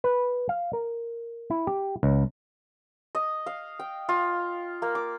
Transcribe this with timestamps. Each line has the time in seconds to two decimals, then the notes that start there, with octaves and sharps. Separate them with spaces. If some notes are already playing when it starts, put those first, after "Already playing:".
0.04 B4
0.49 F5
0.73 A#4
1.50 E4
1.67 G4
2.03 C#2
3.15 D#5
3.46 F5
3.80 G5
4.09 F4
4.82 A#3
4.95 D6